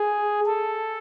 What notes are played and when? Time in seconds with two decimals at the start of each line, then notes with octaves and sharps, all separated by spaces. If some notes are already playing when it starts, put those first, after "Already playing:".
Already playing: G#4
0.46 A4